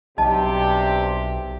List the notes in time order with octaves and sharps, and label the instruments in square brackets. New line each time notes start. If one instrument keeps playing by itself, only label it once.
[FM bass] B1 [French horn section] G2 C3 G4 [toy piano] D#5 A5